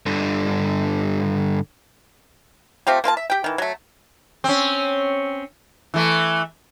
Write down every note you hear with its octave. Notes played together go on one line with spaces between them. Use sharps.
G2 D3
A3 C4 F4 G4
A#3 F4 B4 A5
E5
G4 G5
D#3 E3
F#3 A3
C4 C#4
E3 A3